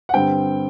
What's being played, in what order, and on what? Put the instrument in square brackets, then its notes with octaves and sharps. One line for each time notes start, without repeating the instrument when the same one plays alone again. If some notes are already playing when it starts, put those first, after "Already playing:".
[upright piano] F#5
G2 D3 G3 C4 G5